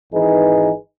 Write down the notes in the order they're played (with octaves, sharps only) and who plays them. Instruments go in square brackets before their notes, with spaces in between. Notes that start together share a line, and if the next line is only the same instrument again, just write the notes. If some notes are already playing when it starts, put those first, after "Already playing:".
[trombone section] G#1 E3 D#4 G#4 B4